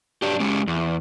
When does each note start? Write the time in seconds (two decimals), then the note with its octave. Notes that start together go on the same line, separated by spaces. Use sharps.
0.22 F#3 D4 G4
0.40 G#3 C#4 G4
0.67 E2